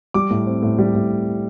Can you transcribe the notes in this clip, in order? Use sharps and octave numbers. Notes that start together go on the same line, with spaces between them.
G3 D6
A2
C4
A2
G3
A2